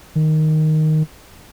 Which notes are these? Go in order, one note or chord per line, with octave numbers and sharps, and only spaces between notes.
D#3